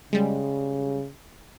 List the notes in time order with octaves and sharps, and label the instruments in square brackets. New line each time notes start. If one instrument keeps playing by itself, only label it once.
[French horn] C#3 [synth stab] G3 G#3